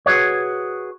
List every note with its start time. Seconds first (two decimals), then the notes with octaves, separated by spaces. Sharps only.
0.06 F#4 G#4 B4 C#5